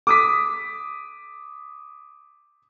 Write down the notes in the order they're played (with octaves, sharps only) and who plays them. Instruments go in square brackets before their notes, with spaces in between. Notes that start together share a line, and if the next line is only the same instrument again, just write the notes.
[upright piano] D6 D#6 B6